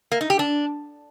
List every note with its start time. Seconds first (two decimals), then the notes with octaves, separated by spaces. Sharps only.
0.12 A#3
0.21 D#4
0.30 G4
0.39 D4